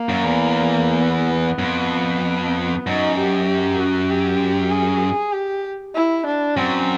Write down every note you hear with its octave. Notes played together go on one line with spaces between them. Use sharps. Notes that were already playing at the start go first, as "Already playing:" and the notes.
Already playing: A#3
F#2
E2
B3
F#2
F2
F#2 D#4
G4
G4
F#4
G4
G#4
G4
E4
D4
F#2 C4